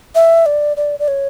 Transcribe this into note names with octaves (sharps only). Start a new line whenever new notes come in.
E5
D5
D5
D5
C#5